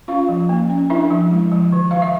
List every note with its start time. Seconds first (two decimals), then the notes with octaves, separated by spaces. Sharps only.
0.08 C#4 F4 F5
0.29 F3
0.49 A#3
0.70 C#4
0.90 D4 E4 E5
1.11 F3
1.31 G#3
1.51 F3
1.72 D#3
1.91 D#3 F5
2.02 E5